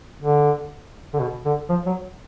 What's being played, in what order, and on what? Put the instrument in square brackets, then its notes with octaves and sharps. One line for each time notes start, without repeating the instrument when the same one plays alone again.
[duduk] D3
D3
B2
D3
F3
F#3